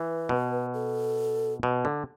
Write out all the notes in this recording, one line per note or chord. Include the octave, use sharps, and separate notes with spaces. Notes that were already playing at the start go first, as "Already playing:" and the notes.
Already playing: E3 B4
B2
A4
B2
D3